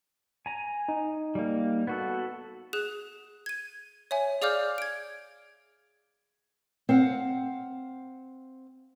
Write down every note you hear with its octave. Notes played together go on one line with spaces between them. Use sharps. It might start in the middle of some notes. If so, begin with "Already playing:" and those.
G#5 A#5
D#4
G3 A#3
B3 F#4 A4
G#4 F#6 E7
G#6 D#7
C#5 E5 G#5
G#4 D5 F5 D6 F6 G6
G#6 D7
C4 F5 F#5